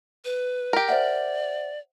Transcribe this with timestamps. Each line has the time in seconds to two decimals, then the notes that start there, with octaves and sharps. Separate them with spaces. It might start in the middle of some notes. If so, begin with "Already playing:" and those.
0.25 B4
0.73 G4 A#4
0.88 C5 D5 E5 F#5